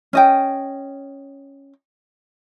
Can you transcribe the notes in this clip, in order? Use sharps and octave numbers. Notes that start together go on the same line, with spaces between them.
C#4 D#5 G5